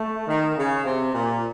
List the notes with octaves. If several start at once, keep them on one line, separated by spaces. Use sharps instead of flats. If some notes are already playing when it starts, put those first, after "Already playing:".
Already playing: A3
D#3
C#3
C3
A#2